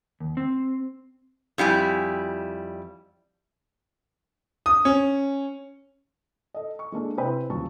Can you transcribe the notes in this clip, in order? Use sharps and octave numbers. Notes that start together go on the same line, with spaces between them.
D#2
C4
F2 G3 E4 G#5
D#6
C#4
A4 D#5
C#6
G#3 A#3 D4 A4
C3 E4 B4 C5 G5 B5
D#1 A#2 C#3 F#3 A5 C#6